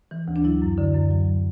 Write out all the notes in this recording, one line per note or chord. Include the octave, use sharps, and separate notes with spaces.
E3
D2
D4
F#3 E4
F#2
D3
F#2
F#3